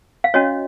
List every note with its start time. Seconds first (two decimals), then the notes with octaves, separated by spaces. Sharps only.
0.24 F5
0.34 C#4 F#4 C#5 D#5